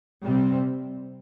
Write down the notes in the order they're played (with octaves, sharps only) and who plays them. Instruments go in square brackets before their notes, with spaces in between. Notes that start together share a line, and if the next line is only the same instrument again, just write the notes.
[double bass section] C3 G3 C4